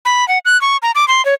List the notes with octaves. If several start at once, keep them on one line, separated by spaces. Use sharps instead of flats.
B5
F#5
F#6
C#6
A#5
D6
C6
C#5